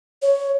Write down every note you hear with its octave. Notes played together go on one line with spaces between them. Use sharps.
C#5